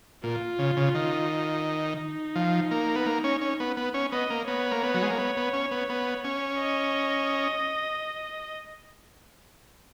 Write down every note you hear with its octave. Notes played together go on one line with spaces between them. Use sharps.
A#2 F4
C#3
C#3
D#3
D#4
F3
A#3
B3
A#3
C#4
C#4
B3
B3
C#4
B3 D#5
A#3
B3 C#5
A#3
B3
F#3
G#3
A#3
B3
B3
C#4
B3
B3
C#4
D#5